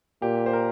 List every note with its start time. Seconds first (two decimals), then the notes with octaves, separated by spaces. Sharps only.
0.22 A#2 G4
0.46 C5
0.53 A#4